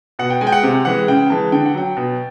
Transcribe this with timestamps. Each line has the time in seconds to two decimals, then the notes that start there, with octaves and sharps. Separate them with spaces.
0.19 B2 F#5
0.30 G5
0.41 G#3 G#5
0.47 G5
0.52 F#5
0.63 C3
0.85 E3 G#3 F#5
1.08 C#3 G5
1.30 E3 G#3 A5
1.52 D3 G5
1.65 F#5
1.75 F#3 G5
1.97 B2